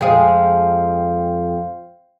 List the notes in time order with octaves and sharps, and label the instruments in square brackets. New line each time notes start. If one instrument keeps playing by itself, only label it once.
[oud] F2 G#3 G#4 [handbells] C5 F5 G5